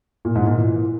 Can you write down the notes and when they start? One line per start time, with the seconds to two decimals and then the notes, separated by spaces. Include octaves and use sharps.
0.25 A#2
0.35 G#2
0.46 A#2
0.57 E3